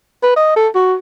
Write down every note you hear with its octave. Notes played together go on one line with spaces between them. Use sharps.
B4
D#5
A4
F#4